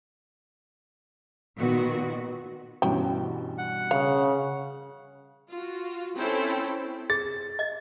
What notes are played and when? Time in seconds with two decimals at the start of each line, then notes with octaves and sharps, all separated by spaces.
1.58 A#2 D#3 B3 F#4
2.82 G2 B2 E3 C#4 G5
3.58 F#5
3.91 C#3 F5
5.50 F4 F#4
6.16 C4 C#4 E4 A4 C5 G5
7.10 G#4 A6
7.59 D#5